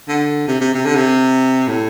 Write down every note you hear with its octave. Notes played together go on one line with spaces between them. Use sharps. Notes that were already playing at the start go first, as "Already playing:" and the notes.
D3
C3
C3
C3
D3
C3
A2